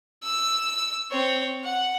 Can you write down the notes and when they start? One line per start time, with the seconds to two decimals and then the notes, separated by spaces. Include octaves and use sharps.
0.23 E6
1.11 C4 C#5
1.63 F#5